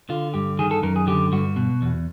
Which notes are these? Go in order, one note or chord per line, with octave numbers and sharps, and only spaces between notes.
D3 F4
G2 G4
D#3 G#4
A4
F#2 A#4
G#4
D3 G4
G2 F#4
B2
E2